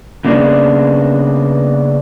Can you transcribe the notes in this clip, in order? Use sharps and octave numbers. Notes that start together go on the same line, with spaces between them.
C#3 A#3 B3 D4